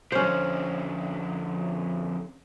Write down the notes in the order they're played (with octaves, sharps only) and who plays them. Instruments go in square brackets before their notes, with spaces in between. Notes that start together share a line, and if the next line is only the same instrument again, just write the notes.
[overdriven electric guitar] F2 D3 [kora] C#4 C5